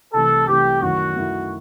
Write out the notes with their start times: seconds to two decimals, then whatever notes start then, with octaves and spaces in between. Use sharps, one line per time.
0.14 C2 C3 E3 A3 A4
0.48 C2 C3 E3 A3 G4
0.81 F#2 D#3 A3 E4 F#4
1.16 F#2 D#3 A3 E4